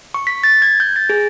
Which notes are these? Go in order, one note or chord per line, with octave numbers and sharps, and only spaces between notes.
C#6
B6
A6
G#6
G6
A6
G#4